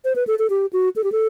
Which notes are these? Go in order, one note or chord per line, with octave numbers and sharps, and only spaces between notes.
C5
B4
A4
A4
G4
F#4
A4
G4
A4